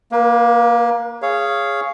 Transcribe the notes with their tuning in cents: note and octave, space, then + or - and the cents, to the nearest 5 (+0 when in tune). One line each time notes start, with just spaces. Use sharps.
A#3 +15 B4 -40
G#4 +0 C#5 +0 F5 -15